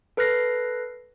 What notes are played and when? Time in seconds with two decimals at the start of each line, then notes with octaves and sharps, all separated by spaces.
0.17 A4 B4 F6 F#6 A#6 C7